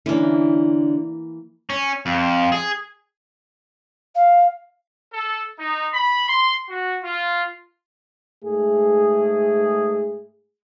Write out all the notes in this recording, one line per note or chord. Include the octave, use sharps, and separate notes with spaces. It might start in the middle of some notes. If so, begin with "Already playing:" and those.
D3 E3 A#3 C#4 D4
C#4
F2
G#4
F5
A4
D#4
B5
C6
F#4
F4
G#2 A3 G#4